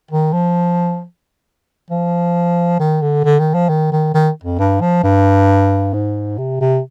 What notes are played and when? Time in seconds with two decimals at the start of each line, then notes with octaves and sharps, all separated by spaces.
0.11 D#3
0.33 F3
1.90 F3
2.79 D#3
3.02 D3
3.24 D3
3.39 D#3
3.54 F3
3.69 D#3
3.92 D#3
4.14 D#3
4.44 F2
4.59 G2
4.81 F3
5.03 G2
5.94 G#2
6.38 C3
6.61 C3